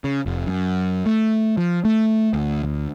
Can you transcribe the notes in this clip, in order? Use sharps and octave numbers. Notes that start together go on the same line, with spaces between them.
C#3
F1
F#2
A3
F3
A3
D2
D2